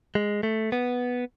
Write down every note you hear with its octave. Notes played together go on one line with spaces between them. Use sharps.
G#3
A3
B3